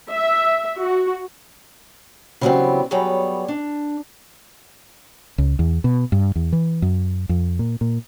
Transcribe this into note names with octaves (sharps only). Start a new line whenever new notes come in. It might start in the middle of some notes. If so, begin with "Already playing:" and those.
E5
F#4
C#3 E3 F#3 G3 B3 C4
F#3 G3 B3 G#4 C#5 D5
D4
C#2
E2
B2
G2
E2
E3
F#2
F2
A#2
A#2